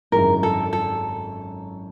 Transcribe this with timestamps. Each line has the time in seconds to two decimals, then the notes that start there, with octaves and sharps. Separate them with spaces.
0.12 G#1 F#2 C#3 E3 A#4
0.43 A4
0.73 A4